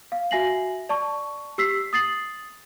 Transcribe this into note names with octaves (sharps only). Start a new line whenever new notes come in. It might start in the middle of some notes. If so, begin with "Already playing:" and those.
F5
F#4 E5 G#5 A#6 C7 F#7
D5 A5 C#6
G4 E6 B6 C7
D#6 A6 C7 F#7